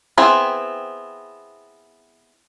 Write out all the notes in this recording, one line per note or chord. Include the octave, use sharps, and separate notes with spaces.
B3 C4 E4 G#4 G5